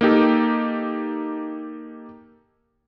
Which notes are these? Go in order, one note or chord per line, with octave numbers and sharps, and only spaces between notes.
A#3 D#4 G4 A4